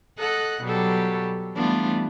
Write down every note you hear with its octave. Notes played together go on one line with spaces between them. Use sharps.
A4 D#5 F#5 F#6
B2 F#3 G3 G4 A4
E3 G3 A3 B3 D4 F4